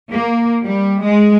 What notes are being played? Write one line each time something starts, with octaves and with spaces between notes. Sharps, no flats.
A#3
G3
G#3